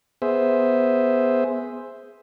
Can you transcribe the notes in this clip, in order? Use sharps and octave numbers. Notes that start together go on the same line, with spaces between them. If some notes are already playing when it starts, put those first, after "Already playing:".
B3 G#4 C5 E5